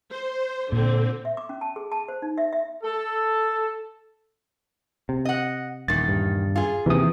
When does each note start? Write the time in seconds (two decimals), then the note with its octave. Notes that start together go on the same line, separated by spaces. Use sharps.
0.12 C5
0.72 A#2 D3 C4
1.25 E5
1.37 D6
1.49 C#4
1.61 A5
1.76 G#4
1.92 A5
2.08 C5
2.22 D#4
2.38 E5
2.53 E5
2.84 A4
5.09 C3
5.25 D#5 F#5
5.88 D#1 E2 D#3 A6
6.08 G2
6.56 F4 G#4
6.86 D#2 C3 E3 D#6